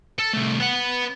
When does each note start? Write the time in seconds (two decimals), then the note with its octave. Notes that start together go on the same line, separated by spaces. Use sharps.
0.19 A4
0.33 C2 A3
0.60 B3 F#5